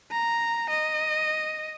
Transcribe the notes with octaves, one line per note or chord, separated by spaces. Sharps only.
A#5
D#5